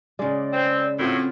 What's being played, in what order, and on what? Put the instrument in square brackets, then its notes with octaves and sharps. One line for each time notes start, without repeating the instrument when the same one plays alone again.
[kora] C#3 G#3 [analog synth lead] D5
[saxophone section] C4 [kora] B4
[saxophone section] A2 [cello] C4 [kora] F4 F#4 B4